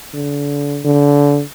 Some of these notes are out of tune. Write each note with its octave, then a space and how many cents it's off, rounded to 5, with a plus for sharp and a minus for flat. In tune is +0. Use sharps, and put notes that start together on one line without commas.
D3 -35
D3 -30